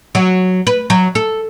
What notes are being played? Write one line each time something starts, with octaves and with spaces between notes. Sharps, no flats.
F#3
B4
F#3
A4